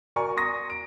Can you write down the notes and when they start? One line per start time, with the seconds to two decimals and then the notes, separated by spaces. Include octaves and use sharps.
0.16 F#4 A#4 D5 G#5 A#5 C#6
0.36 C6 C#6 D#6 A#6
0.70 D7